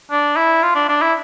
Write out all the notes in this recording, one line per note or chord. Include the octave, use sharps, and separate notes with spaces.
D4
E4
F4
D4
D4
E4